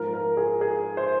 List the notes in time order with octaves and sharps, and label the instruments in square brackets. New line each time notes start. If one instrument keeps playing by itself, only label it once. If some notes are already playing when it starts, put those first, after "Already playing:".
Already playing: [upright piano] G#2 F3 A#4
A#4
G#4
G#4
C5